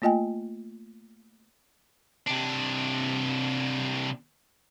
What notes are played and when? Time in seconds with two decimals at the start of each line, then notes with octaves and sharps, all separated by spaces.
0.02 A3 A#3 F4 D#5 G5 G#5
2.27 C3 D4